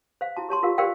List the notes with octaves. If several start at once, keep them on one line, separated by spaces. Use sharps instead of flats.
C5 F5
E4 F#4 A5
G4 C#5 A5 C6
F4 G4 A#4 F5
G4 A#4 C5 D5 F5 G5